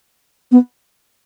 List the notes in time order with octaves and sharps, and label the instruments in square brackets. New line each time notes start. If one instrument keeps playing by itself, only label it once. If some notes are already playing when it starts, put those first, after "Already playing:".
[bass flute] B3